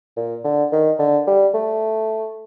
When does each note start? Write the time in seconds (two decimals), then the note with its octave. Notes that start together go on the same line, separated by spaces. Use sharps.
0.16 A#2
0.44 D3
0.72 D#3
0.99 D3
1.27 G3
1.54 A3